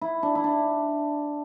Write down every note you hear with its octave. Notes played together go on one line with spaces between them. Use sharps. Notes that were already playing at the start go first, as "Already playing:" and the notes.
E4
D4
E4
D4